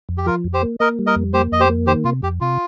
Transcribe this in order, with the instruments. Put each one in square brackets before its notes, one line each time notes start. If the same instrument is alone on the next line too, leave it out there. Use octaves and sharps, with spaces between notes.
[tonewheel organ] F2
[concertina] G4
[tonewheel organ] F3 [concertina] F4 A#4
[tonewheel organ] F2
[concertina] G4 C5
[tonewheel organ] A#3
[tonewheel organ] A#3 [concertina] A#4 D#5
[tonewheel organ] G3
[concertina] A#4 D#5
[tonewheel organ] F2
[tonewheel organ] A#3 [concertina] G4 C5
[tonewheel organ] F2 [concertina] D#5
[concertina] G4 C5
[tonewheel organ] A#3
[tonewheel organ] D#3 [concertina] G4 C5
[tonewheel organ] C3 [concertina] F4
[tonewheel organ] F2 [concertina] G4
[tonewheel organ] C3 [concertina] F4